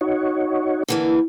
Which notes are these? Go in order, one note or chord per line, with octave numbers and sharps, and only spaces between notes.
D#4 F#4 C#5
D3 E3 A#3